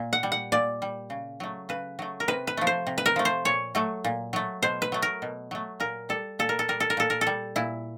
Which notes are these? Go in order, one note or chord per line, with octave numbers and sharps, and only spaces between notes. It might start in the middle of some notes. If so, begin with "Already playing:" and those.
Already playing: A#2
F#5
G3
F#5
A#2 D5
G3
C#3
F#3 A3
C#3 B4
F#3 A3
A#4
C3 B4
B4
F3 A3
C5
C3
B4
A#4
F3 A3
C5
A#2 C#5
F#3 A3
A#2
F#3 A3
B2 C5
B4
F#3 A3
A#4
B2
F#3 A3
A#2 A#4
G3 A4
A#2 A4
A#4
A4
G3 A#4
A4
A#4
A#2 A4
A#4
A4
G3
A#2 E4